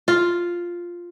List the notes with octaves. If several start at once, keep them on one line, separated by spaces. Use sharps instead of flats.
F4